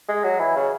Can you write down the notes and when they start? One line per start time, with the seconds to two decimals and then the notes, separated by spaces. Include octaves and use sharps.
0.08 G#3
0.24 F#3
0.39 E3
0.56 C#3